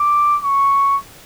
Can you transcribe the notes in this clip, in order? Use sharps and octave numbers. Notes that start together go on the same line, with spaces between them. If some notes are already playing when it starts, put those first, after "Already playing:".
Already playing: D6
C#6